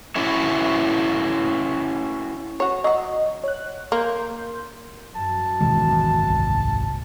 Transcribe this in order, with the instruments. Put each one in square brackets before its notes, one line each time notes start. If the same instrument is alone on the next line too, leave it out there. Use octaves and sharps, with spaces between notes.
[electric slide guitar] C#4 E4 F#4 A4 E5
[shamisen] F#4 C#5
[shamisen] F#3 F#4 [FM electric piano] D#5
[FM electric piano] C#5 F#6
[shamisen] A#3 [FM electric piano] C6 G6
[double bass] F#2 [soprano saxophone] A5
[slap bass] G#1 D#2 [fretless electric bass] B2 E3 G#3
[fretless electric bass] C2